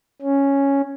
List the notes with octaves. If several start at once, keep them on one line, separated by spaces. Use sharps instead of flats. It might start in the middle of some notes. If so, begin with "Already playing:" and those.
C#4